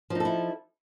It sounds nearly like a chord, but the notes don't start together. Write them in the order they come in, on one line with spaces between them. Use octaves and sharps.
F3 D#4 A4 E4